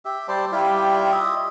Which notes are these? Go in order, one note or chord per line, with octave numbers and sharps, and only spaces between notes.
G4 E5
G3 C5 D5 A5
G3 E4 F4 G4
D#5 E5